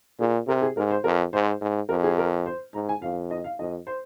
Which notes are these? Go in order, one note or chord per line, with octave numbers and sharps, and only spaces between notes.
A#2 G#4
C3 A#4
G#4
G#2 A#4
C5
F2 A#4
G#2 C5
G#2
F2 A#4
G#4
A#4
C5
G#2 A#5
G#5
F2 F5
D#5
F5
F2 D#5
C5